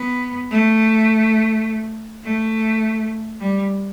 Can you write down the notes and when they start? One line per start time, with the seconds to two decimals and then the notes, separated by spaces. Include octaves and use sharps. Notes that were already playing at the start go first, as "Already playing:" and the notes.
Already playing: B3
0.51 A3
2.24 A3
3.39 G3